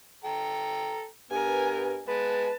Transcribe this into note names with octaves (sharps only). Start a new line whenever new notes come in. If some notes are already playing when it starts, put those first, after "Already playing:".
A4 G5 A#5
G2 B3 A#4 G#5
G#3 B3 B4 A5